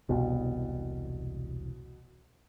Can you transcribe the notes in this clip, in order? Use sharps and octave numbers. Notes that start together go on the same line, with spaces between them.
E1 C2 B2